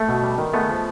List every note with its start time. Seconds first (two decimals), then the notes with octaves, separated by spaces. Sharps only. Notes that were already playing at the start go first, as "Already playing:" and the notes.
Already playing: A3
0.08 B2
0.23 G3
0.38 D#3
0.53 G#3 A3 B3
0.69 F3